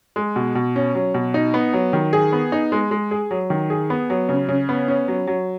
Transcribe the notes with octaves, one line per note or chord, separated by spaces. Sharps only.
G#3
B2
B2
C#4
F#3
B2
D#4
B3
F#3
D#3
G#4
B3
D#4
G#3
G#3
G#4
F#3
D#3
G#4
B3
F#3
C#3
C#3
B3
C#4
F#3
F#3